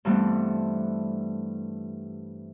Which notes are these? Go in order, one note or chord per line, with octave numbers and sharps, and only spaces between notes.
G2 E3 G3 A3 B3 C4